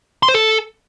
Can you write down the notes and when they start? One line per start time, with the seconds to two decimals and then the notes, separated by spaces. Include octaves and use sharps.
0.23 C6
0.29 C5
0.34 A4